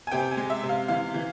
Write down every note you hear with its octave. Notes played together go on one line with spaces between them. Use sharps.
G#5
C3 G5
G#5
G#3
E5
C3
F5
E3 F5
E3